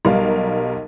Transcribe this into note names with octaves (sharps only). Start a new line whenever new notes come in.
B1 G3 A#4 F5